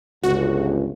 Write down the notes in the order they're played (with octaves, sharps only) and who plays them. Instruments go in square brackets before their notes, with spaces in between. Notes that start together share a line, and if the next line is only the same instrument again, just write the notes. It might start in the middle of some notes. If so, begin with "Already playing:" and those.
[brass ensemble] G1 C#2 [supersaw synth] F#4